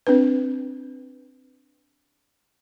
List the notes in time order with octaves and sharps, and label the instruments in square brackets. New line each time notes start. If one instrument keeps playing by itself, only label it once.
[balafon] C4 D4 B4